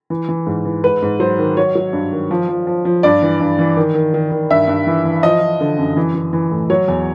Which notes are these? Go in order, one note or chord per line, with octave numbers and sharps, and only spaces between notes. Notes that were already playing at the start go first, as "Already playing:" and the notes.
E3
E3
G#2
E3
G#2 B4
G#2
F#3 C5
D#3
F#3 C#5
F#3
G2
D#3
F3
F3
F3
F3
G2 D5
E3
G2
E3
D#3
D#3
D#3
D#3
G2 E5
G2
E3
E3
F3 D#5
F3
D3
F#2
E3
E3
E3
A2
F#3 C#5
E2